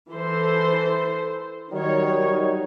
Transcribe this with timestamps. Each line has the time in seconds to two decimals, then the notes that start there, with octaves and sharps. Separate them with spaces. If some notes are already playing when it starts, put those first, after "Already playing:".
0.11 E3 A4 C5
1.72 D#3 F#3 G3 D#4 C#5